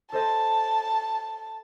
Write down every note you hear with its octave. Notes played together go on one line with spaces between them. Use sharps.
A4 C5 D#5 A5